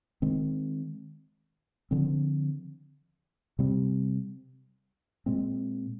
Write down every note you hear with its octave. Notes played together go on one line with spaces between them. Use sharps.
D#3 G#3 C4
D3 F3 C4
C3 G3 C4
A#2 G#3 C4